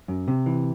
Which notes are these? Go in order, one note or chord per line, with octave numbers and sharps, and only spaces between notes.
F#2
C3
E3